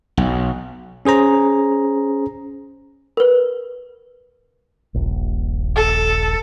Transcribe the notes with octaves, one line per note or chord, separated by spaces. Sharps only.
B1
C#4 G#4 C5 A#5
A#4 B4
D#1 A#1
A4